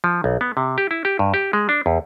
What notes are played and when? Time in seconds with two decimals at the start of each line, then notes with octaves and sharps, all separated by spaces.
0.04 F3
0.24 B1
0.41 B3
0.57 C3
0.78 G4
0.91 E4
1.05 G4
1.19 G2
1.34 G4
1.53 G#3
1.69 D4
1.86 E2